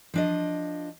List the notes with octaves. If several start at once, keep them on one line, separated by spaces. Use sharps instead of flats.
F3 D4 D#5